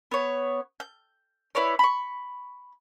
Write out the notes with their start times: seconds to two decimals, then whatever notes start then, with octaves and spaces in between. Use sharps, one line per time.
0.11 B3 C#5
0.80 G6
1.55 E4 B4 C#5 D5
1.79 B5 C#6